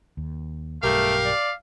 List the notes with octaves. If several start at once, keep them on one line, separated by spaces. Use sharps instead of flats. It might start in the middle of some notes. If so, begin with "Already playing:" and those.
D#2
B1 G2 A3 G4 A#4 F5
D5